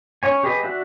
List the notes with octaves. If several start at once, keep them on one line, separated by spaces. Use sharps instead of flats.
C#4 C#5 G#5
G4 G#4 B4 D#5
D4 F#4 E5